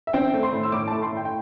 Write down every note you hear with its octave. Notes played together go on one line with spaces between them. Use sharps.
E5
C4 G5
A3
C6
A2
E6
A2 D6
A3 A5
C6
A2 G5
G5